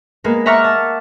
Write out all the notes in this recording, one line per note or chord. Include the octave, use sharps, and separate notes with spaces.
G#3 A#3 B3
E5 F#5 A#5 C#6 D6 F6
A5